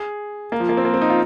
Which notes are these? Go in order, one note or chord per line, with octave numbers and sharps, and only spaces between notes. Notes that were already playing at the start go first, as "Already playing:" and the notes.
Already playing: G#4
A#3
F3
A#3
C4
A#3
C4
D#4
F4